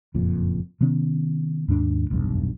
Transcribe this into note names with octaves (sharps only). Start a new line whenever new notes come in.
F#1 F2 A#2
C3 D#3 B3 C#4
D#2 G#2 C#4 D4
F1 B1 E2 G2